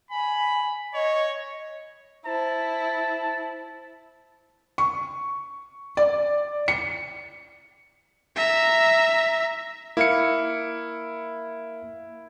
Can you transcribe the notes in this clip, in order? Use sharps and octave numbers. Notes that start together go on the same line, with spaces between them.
G#5 B5
C#5 D#5
E4 C5 A5
C#6
D5
C#7
E5 A#5
A#3 E4 F5 C#7